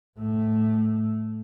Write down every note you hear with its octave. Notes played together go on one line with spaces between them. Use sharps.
A2 A3